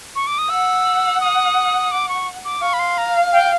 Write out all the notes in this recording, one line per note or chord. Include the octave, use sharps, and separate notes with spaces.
C#6
D6
D#6
F#5 E6
D#6
D6
C#6
D6
F5 C#6
B5
C6
A#5
G5